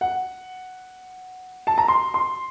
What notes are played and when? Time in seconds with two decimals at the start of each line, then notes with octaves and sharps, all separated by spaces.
0.01 F#5
1.67 A5
1.78 A#5
1.88 C6
2.14 C6